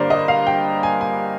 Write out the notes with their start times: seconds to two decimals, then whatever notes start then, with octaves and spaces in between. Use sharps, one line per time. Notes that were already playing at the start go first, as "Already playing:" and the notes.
Already playing: G2 D3 G3 A#3 A#4 C5 D5
0.10 D#5
0.28 F5
0.47 G5
0.83 G#5
1.01 G#5